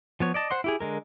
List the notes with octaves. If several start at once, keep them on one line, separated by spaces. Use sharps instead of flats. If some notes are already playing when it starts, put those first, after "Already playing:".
F3 B3 C#5
D5 D#5 A5
C5 F#5 C6
E4 G4 G#4
D3 G#3 A#4